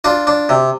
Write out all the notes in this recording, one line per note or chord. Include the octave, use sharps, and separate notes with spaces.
D4 F4
D4
C3